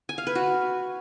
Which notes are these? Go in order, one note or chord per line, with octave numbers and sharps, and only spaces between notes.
G#5
F5
B4
F#4